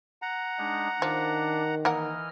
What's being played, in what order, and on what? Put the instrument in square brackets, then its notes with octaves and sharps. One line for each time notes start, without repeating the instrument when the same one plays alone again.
[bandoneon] F#5 A#5
[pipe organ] G#3 D4 D#4
[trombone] D#3 [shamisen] F3 [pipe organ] D4
[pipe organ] E3 D#5 F6 [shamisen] A#3 A#4 F#5